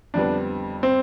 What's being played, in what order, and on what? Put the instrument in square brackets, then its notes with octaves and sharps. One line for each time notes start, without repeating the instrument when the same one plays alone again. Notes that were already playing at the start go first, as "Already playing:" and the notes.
[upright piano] F2 D3 G3 B3 [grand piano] D4
[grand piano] C4